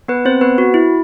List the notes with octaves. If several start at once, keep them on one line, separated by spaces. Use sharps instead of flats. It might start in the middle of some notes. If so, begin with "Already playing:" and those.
B3 B4
C4 C5
B3 B4
F#4
E4